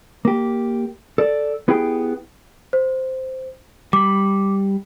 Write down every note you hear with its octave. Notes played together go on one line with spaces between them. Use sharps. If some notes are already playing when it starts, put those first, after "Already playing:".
A#3 G4
A4 D5
B3 E4 G4 G#4 G5
C5
G3 B5 D6